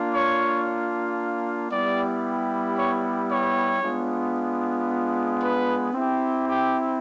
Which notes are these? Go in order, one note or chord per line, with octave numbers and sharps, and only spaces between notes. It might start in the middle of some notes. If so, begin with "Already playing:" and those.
Already playing: A#3 D4 F4
C#5
G3 B3 E4 G4 D5
C#5
C#5
G#3 B3 D4 F4
B4
C4 E4 G4
G4